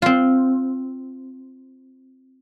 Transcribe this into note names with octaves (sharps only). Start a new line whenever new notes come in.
C4 F4